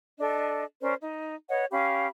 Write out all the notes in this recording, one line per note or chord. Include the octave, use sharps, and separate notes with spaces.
D4 A4 D#5
C#4 A#4 C5 D5
D#4
B4 C#5 D#5 F#5
C#4 G4 F5 B5